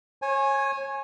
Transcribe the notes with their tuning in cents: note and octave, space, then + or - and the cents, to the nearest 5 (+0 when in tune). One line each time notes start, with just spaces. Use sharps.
C#5 -30 G#5 +0